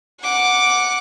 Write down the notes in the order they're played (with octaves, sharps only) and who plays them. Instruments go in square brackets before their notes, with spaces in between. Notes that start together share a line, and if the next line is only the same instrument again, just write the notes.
[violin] F#5 D6